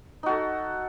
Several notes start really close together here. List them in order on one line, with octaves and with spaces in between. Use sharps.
D#4 F#4 A4